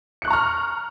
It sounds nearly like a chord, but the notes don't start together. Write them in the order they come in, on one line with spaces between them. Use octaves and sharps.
C#7 F#6 C#6 A#5 F6